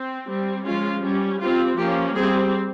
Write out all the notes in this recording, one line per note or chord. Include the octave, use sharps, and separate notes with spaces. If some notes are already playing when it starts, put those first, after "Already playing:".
Already playing: C4
G3 C4
F3 G#3 C#4 F4
G3 C#4
G3 C4 F4
F3 A#3 C#4 G4
G3 C4 G#4